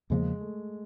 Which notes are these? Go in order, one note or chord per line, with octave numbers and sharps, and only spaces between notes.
E2 C#3 F3 G#3 A#3
A3